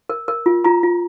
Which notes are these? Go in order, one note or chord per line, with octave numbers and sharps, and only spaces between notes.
A#4
A#4
F4
F4 A#5
F4